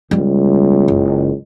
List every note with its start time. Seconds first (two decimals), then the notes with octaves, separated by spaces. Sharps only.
0.11 C#2 G3 B3
0.88 F#1